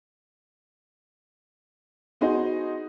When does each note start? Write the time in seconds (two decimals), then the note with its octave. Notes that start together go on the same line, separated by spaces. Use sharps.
2.21 B3 D#4 F#4 G#4 C5 D#5